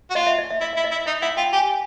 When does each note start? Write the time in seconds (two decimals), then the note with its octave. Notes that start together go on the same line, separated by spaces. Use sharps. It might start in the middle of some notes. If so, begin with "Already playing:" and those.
0.10 F#4
0.15 F4 D#5
0.27 E5
0.38 D#5
0.50 E5
0.61 E4 D#5
0.73 E4 E5
0.84 D#5
0.91 E4
1.06 D#4 E5
1.22 E4 F#5
1.37 F4 G5
1.52 G4 G#5